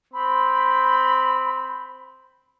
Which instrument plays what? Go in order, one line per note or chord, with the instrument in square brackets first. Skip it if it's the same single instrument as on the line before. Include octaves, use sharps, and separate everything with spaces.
[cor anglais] C4 [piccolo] B5